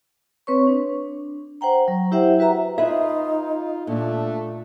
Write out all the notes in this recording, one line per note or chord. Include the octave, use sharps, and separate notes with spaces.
C4 B4 C#5 C#6
D4
C5 F#5 G5 A#5
F#3
E4 G4 C5 E5 F#5 G5
F#4 B4 E5 A#5
D#4 F4 G#4 B4 E5
A#2 A3 D4